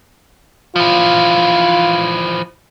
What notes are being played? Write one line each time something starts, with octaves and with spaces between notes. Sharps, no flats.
E3 F3 F4